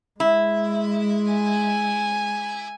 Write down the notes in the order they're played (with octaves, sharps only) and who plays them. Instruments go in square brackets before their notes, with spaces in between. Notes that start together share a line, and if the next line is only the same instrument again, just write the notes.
[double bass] G#3 [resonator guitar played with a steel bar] E4
[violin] G#5